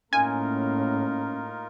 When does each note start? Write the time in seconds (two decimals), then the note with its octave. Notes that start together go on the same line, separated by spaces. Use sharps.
0.13 A2 A#3 C#4 D#4 F4 A#4 G#5